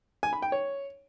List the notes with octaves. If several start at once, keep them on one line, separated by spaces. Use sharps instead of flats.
G#5
B5
G5
C#5